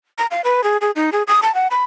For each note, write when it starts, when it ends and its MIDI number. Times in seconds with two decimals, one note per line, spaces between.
0.18 0.26 82
0.31 0.41 77
0.44 0.63 71
0.64 0.77 68
0.81 0.91 68
0.96 1.10 63
1.12 1.23 68
1.27 1.40 87
1.42 1.54 81
1.54 1.67 78
1.71 1.84 83